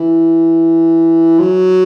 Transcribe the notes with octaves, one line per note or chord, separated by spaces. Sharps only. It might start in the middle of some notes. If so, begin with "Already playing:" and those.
Already playing: E3
F#3